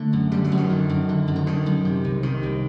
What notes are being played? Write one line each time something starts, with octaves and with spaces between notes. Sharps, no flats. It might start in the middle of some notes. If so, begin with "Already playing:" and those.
Already playing: D3 A3
F#2
D3 G3
F#3
F#2
D#3
D3
F#2
D3
F#2
D3
D3 D#3
F#2
C3
C2
C3 D#3
C2